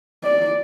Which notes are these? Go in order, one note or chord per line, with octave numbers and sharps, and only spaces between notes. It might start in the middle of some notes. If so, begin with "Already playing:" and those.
D5